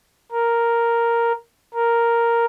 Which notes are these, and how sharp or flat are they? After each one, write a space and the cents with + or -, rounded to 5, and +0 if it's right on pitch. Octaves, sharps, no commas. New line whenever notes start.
A#4 +0
A#4 +0